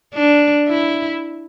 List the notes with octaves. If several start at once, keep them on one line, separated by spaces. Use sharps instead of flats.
D4
E4